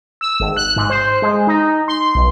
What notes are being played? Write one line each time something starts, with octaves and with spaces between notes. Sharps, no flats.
E6
G#1
F#6
G#2
C5
G#3
D#4
C6
B1